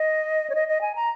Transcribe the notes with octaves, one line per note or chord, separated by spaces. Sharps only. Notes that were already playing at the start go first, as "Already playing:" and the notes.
Already playing: D#5
C#5
D#5
D#5
G#5
A#5